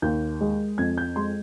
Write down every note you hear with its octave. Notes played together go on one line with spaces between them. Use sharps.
D#2 G6
G#3
F2 G#6
G6
G#3 C6